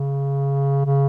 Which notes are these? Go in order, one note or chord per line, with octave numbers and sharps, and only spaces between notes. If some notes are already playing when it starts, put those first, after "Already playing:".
Already playing: C#3
C#3